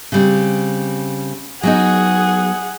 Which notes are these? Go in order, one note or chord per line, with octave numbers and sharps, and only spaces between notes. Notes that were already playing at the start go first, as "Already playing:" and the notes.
C#3 G3 C4
F#3 B3 D#4 G#4 F#5